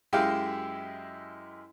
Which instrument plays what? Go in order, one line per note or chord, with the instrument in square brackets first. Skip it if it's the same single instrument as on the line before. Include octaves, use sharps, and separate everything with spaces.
[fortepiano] F#2 G#3 E4 G4 F5 G5